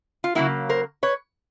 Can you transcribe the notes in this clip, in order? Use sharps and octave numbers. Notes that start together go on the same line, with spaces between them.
F4
C#3 F#3 A#3 E4 F#4
A#4 C5
B4 C#5